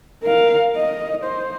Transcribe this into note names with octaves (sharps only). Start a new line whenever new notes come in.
A#4 F5
D#5
C5